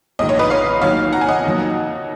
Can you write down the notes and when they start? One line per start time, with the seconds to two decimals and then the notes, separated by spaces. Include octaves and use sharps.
0.19 A#1 G#2 D#3 D#5
0.29 C#5
0.39 B4 D#5
0.50 C#5 F5
0.81 D#2 D#3 F#3 C#5 F5
1.13 F#5 A#5
1.21 G#5
1.28 D#5 F#5
1.45 D#2 D#3 F#3